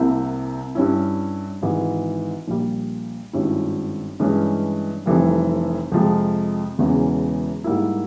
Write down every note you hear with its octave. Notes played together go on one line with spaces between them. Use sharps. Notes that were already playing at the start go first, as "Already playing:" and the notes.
Already playing: C2 C3 G3 A#3 E4
G2 G3 C#4 E4
G#1 G#2 E3
A#1 A#2 G3
G#1 G2 G3 C#4 E4
G2 E3 G#3 C#4
F1 F2 E3 G3
F2 C3 F3 G#3
E1 E2 C#3 E3
G#2 G3 A#3 E4